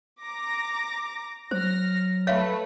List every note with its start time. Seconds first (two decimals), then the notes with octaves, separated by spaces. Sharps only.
0.23 A#5 D6 A#6
1.51 F#3 C5 F6 A#6
2.27 A3 B4 C#5 E5 F5